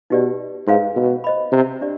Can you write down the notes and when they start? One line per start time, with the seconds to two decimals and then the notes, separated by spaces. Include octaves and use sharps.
0.10 B2 D#4 G4 B4 D5
0.67 G#2 B4 F5 C6
0.96 B2
1.24 C5 D#5 B5
1.52 C3
1.81 D4 G4 D5